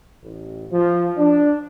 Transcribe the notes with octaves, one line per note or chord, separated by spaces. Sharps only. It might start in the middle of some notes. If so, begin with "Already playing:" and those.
A1
F3
D4